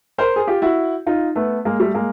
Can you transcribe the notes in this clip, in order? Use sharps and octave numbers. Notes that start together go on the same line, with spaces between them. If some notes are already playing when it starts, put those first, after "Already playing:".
A#4 C5
G#4
F4 G4
E4 F#4
D#4 F4
A3 B3
G#3 A#3
G3 A3
G#3 A#3